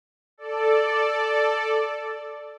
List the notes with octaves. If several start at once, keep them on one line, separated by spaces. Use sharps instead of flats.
A4 D5